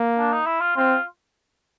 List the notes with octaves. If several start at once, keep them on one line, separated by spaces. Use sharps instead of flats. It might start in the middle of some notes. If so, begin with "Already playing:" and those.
Already playing: A#3
D4
D#4
E4
F4
C4 F4